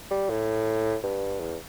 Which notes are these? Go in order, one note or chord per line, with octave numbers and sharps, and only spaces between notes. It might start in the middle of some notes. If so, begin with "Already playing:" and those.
G3
A2
G2
E2